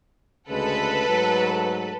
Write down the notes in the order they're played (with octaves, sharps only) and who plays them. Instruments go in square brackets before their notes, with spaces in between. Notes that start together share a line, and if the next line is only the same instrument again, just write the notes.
[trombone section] D2 C#3 G#3 [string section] A4 B4
[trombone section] G#2 F#3 A3